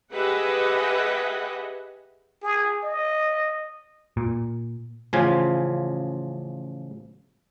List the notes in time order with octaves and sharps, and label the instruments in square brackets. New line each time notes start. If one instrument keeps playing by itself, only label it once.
[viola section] G4 G#4 B4 D#5 E5 F#5
[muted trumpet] G#4
D#5
[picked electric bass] A#2
[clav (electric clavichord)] A1 C#3 F3 F4 G#5